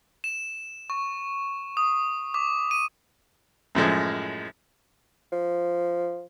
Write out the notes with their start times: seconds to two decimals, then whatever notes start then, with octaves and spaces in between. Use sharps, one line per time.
0.24 E7
0.90 C#6
1.77 D#6
2.34 D6
2.71 D#7
3.75 F#2 A2 F3 G#3
5.32 F3